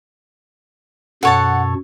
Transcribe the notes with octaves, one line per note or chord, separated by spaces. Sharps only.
F#2 B2 A4 C#5 F#5 A5